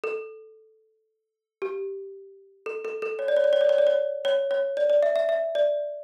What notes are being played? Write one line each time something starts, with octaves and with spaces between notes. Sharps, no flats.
A4
G4
A4
A4
A4
C#5
D5
C#5
D5
C#5
D5
C#5
D5
C#5
C#5
C#5
D5
D5
E5
E5
E5
D5